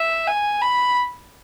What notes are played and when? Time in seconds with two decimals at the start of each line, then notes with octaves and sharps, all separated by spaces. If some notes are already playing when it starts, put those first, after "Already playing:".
Already playing: E5
0.27 G#5
0.62 B5